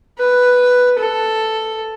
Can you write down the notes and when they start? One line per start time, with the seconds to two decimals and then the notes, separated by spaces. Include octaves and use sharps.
0.19 B4
0.99 A4